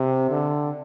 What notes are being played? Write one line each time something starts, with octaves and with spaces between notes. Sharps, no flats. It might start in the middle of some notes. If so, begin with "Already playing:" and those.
Already playing: C3
D3